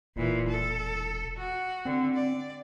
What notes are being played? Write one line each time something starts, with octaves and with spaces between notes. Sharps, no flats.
E1 A#2 E3
A4
F#4
D3 C4
D5